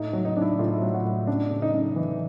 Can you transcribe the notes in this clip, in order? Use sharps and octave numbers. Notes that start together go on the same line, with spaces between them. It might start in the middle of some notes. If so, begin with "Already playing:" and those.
Already playing: A2 D#4
F#3
D#4
D4
E4
A2 F4
F#3
F#4
A2
F#2 D4
C#3
D#4
F#2
E3